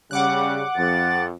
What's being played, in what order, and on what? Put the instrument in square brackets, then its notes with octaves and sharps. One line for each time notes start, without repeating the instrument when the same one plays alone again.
[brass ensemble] C#3 G3 [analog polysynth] F#5 D6 F#6
[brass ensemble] F2 [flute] A6